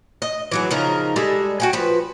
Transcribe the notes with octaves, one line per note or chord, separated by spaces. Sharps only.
D#5
E3 F#3 G#4
C#3 F3 D#4 A#4
G3 G#3 G#4 A4
F#4 G5 G#5
F3 B4